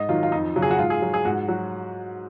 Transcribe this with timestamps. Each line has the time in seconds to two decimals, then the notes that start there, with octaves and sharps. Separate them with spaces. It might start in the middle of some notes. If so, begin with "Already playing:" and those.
Already playing: G#2 D#5
0.09 D#3 F#3 F4
0.23 F4
0.32 F2 D#4
0.56 C#3 F#3
0.62 G#4
0.71 F#4
0.78 G#2 F4
0.90 G#4
1.02 F#3
1.14 G#4
1.25 G#2 F#4
1.48 F#3 F#4